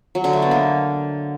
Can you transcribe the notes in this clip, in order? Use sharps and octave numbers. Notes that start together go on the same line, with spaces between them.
F#3
D3
A3
B3
A#3